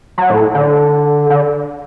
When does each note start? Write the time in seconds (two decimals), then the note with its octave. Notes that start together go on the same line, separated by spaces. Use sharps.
0.18 F#3
0.30 A2
0.54 D3
1.30 D3